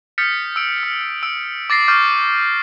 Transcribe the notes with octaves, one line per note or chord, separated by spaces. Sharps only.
D#6 F6 G6 A6 B6 C#7
E6 D7
F6
E6 D7
D6 A6 A#6 C7
C#6 D6 F6 G6 A6